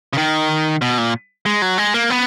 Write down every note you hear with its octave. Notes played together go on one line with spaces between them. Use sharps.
C#3
D#3
B2
A#2
G#3
F#3
G#3
A#3
B3